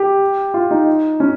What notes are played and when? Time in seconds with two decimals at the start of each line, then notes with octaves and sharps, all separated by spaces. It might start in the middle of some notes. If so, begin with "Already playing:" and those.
Already playing: G4
0.54 F4
0.71 D#4
1.20 C#4